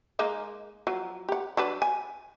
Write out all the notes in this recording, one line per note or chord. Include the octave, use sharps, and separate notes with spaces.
G#3 A#3 D#4
F3 F#3
G4 F#5
F#3 D4 B4
G#5